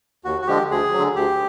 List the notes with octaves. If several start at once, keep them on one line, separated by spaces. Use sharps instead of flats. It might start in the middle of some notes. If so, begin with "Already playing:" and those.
D#2 F#4
F#4
D3 F3 G#3 G4
D2 G#4
D3 F#3
D2 G4